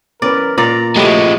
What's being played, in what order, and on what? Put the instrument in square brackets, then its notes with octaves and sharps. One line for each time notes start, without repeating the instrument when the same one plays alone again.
[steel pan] B3 C#4 B4 [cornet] A#4 [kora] D5
[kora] A#2 D5 [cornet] A#5
[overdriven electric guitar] F3 G#3 [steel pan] A3 G4 B5 [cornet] F#4